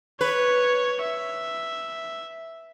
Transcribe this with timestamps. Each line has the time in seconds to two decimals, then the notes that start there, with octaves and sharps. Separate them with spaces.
0.21 B4 C#5
1.01 E5